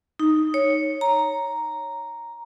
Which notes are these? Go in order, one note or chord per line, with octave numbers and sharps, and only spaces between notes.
D#4
C#5
A#5